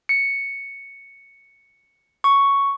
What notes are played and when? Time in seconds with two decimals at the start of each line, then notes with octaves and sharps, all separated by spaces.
0.09 C#7
2.24 C#6